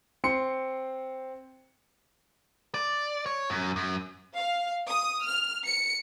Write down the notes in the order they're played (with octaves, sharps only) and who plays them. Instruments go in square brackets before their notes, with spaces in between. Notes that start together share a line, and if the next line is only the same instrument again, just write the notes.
[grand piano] C4 C6 C#7
[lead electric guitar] D5
C#5
F#2
F#2
[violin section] F5
D#6
F6
C#7